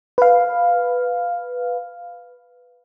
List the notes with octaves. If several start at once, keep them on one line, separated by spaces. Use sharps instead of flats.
B4 F5